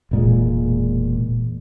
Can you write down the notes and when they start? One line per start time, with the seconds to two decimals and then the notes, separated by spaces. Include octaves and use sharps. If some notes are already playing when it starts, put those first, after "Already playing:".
0.11 E1 A#2 G#3